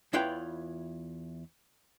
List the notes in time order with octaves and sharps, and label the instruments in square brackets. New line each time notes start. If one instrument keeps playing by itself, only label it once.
[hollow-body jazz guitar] E2 E4 F4 B4 C#5 G5